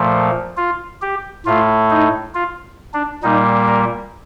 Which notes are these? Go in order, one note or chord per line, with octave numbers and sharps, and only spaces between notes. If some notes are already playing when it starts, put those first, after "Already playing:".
Already playing: A#2 F3 A3
F4
G4
A2 A3 F4
D#4
F4
D4
A#2 G3 A#3 D#4
A#4